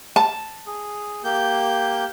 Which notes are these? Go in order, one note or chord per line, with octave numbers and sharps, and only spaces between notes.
A5
G#4
A#3 G4 G6